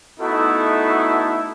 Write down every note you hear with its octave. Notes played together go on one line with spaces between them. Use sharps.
A3 B3 D#4 E4 F#4 A4